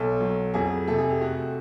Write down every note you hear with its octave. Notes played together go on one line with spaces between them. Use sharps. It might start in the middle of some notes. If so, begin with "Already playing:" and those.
Already playing: B1 A4
F#3
F2 G#4
C3 A4
G#4
G4
A3 F#4